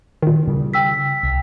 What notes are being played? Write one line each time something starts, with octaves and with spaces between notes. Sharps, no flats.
A#2 D#3
C#3 G3
G5 E6 B6
C2